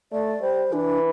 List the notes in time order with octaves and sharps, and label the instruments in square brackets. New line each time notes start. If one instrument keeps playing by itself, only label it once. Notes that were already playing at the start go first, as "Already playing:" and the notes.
[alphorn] A3 [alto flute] D5
[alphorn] G3 [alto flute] C5
[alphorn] E3 [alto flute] D4